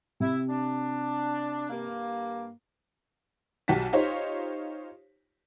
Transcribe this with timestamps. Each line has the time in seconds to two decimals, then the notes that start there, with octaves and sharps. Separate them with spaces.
0.20 C3 E4
0.49 D4
1.69 G2 A#3
3.68 B1 F#4 G4 A5 B6
3.93 D#4 F4 G4 C5 C#5